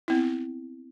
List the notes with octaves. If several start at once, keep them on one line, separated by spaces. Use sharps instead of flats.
B3 C4 E4